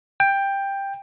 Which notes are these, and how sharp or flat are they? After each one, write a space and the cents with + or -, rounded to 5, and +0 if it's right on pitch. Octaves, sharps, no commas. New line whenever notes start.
G5 +10